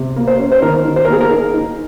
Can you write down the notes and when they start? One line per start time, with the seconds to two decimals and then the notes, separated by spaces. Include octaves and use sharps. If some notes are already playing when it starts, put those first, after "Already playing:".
Already playing: C3
0.16 A#3
0.28 C5
0.39 C#4
0.52 C5
0.62 D#3 A#4
0.85 D#3
0.96 C5
1.05 A#4
1.09 A#3 G#4
1.21 A#4
1.31 D#4
1.54 D#4